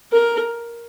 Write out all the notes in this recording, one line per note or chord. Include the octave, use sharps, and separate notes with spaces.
A#4